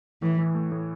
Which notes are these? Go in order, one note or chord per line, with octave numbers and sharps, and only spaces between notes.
A2 E3
E3
A3
A2